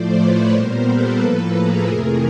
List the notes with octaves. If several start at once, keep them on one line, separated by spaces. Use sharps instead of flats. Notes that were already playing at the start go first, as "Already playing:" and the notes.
Already playing: A2 F3 A3 C5 D5
B4 C#5
A#2 G3 B3 A#4 C5
A4 B4
A2 F3 A#3
G#4 A#4
F2 C3 E3 A3